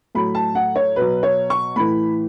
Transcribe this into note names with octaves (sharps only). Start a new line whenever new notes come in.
A2 F#3 B5
A5
F#5
C#5
B2 F#3 B4
C#5
C#6
A2 E3 B5